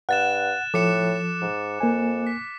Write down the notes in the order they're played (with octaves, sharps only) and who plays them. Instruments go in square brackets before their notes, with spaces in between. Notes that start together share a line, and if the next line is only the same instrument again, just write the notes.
[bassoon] G2 [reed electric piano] F#5 [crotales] F#6 A6 E7
[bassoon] A2 [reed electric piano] F3 A4 [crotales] D6 C#7 E7
[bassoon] G#2
[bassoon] F2 [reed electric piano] A#3 G#5
[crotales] B6